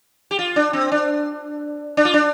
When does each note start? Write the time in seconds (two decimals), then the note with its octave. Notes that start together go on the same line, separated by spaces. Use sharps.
0.31 G4
0.39 F4
0.56 D4
0.73 C4
0.92 D4
1.97 D4
2.05 F4
2.14 D4